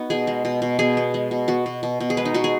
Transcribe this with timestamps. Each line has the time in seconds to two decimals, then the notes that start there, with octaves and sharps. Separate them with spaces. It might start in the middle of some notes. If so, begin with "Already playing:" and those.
Already playing: B3 D#4 F#4
0.10 B2 G#4
0.27 G#3
0.45 B2
0.62 B2
0.79 B2 G#4
0.97 B3
1.14 G#3
1.31 B2
1.48 B3 F#4
1.66 B2
1.83 B2
2.00 B2
2.10 G#4
2.17 G#3 B4
2.25 D#4
2.34 B2 F#4
2.44 G#4